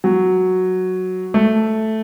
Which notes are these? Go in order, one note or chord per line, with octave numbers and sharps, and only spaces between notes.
F#3
A3